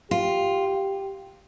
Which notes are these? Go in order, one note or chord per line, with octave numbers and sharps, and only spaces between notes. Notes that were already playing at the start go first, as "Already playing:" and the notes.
F4 G4